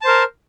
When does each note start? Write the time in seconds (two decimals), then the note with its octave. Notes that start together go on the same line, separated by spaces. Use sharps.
0.01 A5
0.04 C5
0.07 A#4